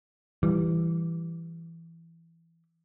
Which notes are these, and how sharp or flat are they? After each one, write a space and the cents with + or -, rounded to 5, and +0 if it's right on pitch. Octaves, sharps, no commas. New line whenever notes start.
E3 +10 G3 +0